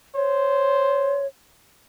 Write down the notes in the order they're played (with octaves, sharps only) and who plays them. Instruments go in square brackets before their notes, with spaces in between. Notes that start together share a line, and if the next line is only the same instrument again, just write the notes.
[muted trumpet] C5 [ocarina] C#5